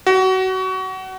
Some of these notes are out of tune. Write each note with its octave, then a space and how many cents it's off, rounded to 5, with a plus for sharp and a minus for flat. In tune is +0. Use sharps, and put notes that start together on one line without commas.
F#4 +25